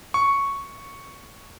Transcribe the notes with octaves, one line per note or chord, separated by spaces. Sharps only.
C#6